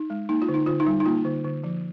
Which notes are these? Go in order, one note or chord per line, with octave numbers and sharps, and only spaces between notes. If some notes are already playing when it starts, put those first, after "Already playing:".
Already playing: D#4
G#3
A#3 D#4
F4
D3
D#4
D3 F4
D#4
G3
D#4
A#3 F4
D3
D3
F3